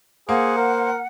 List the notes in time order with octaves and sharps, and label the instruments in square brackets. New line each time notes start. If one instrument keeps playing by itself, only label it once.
[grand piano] A#3 [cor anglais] G#4 [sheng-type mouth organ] C5 [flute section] F#5
[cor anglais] A#4